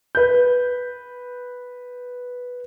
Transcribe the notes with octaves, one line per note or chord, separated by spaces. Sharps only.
B4 G6